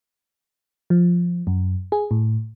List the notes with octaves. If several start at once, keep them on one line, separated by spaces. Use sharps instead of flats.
F3
F#2
G#4
A2